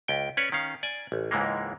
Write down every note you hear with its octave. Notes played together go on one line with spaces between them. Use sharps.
C#2 G5
C#4 B4 C#5 D5
D#3 C#4 F5
D5 G#5
A1
C#2 G#2 E3 G#3 A#3